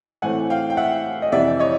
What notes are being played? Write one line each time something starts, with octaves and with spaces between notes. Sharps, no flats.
A2 E3 A3 C4 F#5 G#5
F5 G5
G5
E5 F#5
D#5
F2 C3 E3 D5 E5
C#5 D#5